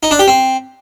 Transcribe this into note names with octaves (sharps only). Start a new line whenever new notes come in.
D#4
D4
G4
C4